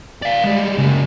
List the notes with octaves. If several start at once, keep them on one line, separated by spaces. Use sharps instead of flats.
D5 F5
G3 G#3
C#3 F#3